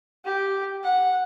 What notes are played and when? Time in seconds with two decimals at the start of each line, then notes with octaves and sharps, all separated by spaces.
0.25 G4
0.84 F#5